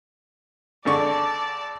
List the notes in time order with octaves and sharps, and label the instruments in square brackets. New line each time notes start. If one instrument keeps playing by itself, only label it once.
[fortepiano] G#1 D3 C#6 [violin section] D5 A5